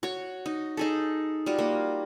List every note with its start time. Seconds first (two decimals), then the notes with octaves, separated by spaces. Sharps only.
0.03 F#4 C#5
0.46 D#4
0.77 D#4 G#4 A4
1.46 G3 F4 F#4
1.58 A#3